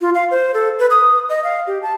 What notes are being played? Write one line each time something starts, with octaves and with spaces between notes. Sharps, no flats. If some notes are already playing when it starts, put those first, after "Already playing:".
F4
F5
C5
A4
B4
D#6
D#5
F5
G4
A5